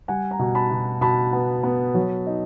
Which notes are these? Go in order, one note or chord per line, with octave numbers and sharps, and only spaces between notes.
G3 F#5 G#5
G#5 A#5
B2
A5 B5
B2
B2 A5 B5
B3
B3
F#3
D#4